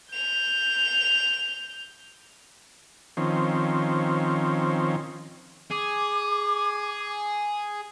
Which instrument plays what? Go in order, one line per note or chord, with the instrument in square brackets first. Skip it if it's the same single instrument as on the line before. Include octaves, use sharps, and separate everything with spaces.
[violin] G6 F7
[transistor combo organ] D#3 F3 C4 C#4
[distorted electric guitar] G#4 [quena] D6